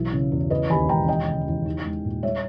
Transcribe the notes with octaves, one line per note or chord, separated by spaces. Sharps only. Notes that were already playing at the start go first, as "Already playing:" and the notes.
Already playing: B1 E3 E5
C#3
E2
C#3 B4 D#5
D#2 G#5 B5
E1 G5 A#5
E3 D#5 G5
C#3
E2
D#4
G#3
A#2
G3 C#5 E5